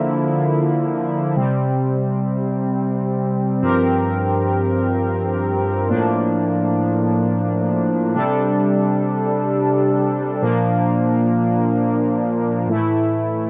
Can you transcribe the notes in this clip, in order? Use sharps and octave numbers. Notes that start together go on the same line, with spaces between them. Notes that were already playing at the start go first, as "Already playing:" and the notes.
Already playing: D3 F3 A#3 E4
C3 G3 C4
G2 F3 C4 G4 A#4
A2 F3 A#3 D4
C3 G3 D4 A4
A#2 F3 A#3 D4
A2 E3 A3 E4